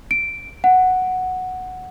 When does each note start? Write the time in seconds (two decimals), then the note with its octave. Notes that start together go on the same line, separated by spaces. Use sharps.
0.11 D7
0.64 F#5